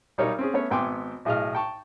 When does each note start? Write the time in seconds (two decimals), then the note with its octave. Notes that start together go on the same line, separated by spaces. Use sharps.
0.18 B1 G3 D#4 A#4 C#5 D5
0.39 C4 C#4 G#4
0.53 A3 B3 C#4 C#5
0.70 G#1 B3 G5 G#5 C6 D6
1.25 B1 A2 G#4 D#5 F5 F6
1.55 G5 A5 C#6